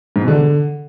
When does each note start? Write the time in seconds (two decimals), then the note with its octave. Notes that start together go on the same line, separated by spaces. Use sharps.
0.16 G#2
0.22 B2
0.28 D3